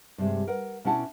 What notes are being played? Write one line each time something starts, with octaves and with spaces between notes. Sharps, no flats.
G2 C3 G#3
A#4 B4 F#5
B2 C#4 D4 E4 F#5 A5